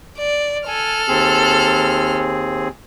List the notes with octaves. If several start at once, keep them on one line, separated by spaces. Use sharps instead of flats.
D5
A4 G#5 F6
D#2 C4 G#4